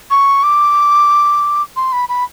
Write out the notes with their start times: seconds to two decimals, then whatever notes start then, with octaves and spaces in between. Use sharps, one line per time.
0.11 C#6
0.43 D6
1.76 C6
1.93 B5
2.09 B5